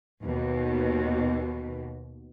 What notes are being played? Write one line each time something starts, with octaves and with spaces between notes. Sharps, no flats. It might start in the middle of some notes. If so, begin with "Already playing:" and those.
D#2 B2